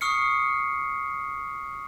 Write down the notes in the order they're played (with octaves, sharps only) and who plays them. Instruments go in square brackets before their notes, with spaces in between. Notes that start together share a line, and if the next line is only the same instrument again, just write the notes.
[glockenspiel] C#6 D#6 F6 C7 C#7